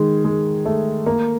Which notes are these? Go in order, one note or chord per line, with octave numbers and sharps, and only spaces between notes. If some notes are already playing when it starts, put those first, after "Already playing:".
Already playing: D#3 G#3
G#3
A3
A#3